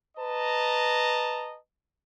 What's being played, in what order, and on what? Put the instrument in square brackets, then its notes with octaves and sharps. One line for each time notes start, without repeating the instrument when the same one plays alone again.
[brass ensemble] B4 D#5 A5 A#5